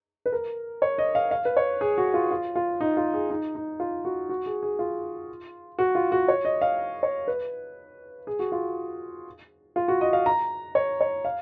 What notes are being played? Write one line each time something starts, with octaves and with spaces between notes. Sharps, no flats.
B4
A#4
C#5
D#5
F5
F5
B4
C#5
G#4
F#4
F4
F4
F4
D#4
F4
G#4
D#4
D#4
F4
F#4
F#4
G#4
G#4
F4
F#4
F4
F#4
C#5
D#5
F5
C#5
B4
G#4
F#4
F4
F4
F#4
D#5
F5
A#5
C#5
C#5
F5